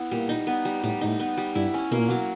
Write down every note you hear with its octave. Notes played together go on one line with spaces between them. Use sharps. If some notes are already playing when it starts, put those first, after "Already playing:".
Already playing: B3 E4
A#2 G3
D#4
B3
G3
A2 G3
G#2 D#4
A2
B3
G3
G2 E4
C#4
B2 A#3
A#2
B2 F#3